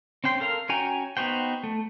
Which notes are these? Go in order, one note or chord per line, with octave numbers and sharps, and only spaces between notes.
C4 C#4 G5 C6
A4 A#4 F5
C#4 F#4 G5 G#5 A#5
B3 D#4 F#4 C5 G5
A3